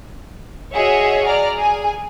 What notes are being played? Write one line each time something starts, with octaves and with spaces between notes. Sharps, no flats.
F#4 G#4 C#5 D#5 E5
D5 A#5 F6
G#4 G#5